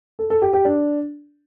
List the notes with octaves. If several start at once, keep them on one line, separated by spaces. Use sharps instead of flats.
A4
A4
G4
G4
D4